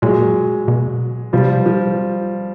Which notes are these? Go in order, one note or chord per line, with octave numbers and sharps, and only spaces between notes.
A#2 F#3 G#3
B2
C3 F3 G3
F3